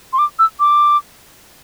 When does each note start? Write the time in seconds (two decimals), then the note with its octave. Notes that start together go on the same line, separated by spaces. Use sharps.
0.13 C6
0.19 D6
0.39 E6
0.60 D6